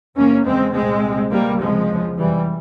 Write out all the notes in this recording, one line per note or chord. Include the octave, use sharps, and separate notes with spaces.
E2 C3 A#3 C#4
E2 C#3 G#3 C4
C2 A#2 G#3 C4
C2 C3
C#2 C3 G3 A#3
C#2 C3 F3 G#3
E2 C#3
F2 C3 E3 G3